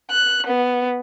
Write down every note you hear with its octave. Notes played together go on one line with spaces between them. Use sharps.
F#6
B3